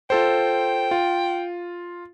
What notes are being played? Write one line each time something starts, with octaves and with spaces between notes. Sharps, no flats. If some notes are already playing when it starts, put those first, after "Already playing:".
F4 A4 C5 G5
F4